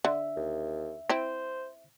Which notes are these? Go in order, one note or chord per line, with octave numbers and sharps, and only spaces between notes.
D3 E5
D#2
C4 E4 C5